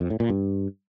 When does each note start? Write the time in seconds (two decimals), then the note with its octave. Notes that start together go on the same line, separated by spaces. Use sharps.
0.01 F2
0.10 A2
0.20 A#2
0.30 G2